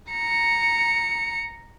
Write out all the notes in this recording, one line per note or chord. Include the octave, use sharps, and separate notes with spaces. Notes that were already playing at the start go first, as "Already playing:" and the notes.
A#5 C#7